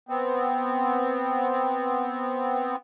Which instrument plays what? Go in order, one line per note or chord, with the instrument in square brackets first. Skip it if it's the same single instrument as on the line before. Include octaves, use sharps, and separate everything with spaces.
[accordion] B3 C4